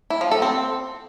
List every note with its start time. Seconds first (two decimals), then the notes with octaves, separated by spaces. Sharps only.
0.10 E4
0.21 F3
0.31 A4
0.42 C4